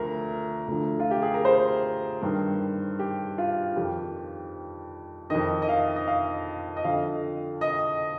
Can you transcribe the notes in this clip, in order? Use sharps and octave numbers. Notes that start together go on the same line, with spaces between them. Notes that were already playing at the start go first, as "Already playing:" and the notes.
Already playing: D2 D3 F3 A#4
D2 D3 F3
F4
G4
G#4
A#4
C5
G2 D#3
G4
F4
F2 D#3 G4
F2 D#3 D#5
D#5
F5
D#5
F5
D#5
F2 D3 F3 F5
D#5